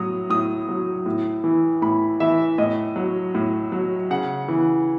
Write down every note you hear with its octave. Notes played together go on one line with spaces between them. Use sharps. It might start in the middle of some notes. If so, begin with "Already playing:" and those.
Already playing: A2 F#3 D#6
A2 D#6
F#3
A2
E3
A2 B5
E3 E5
A2 D#5
F#3
A2
F#3
C#3 F#5
E3